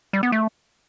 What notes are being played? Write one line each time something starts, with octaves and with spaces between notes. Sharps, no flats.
G3
B3
A3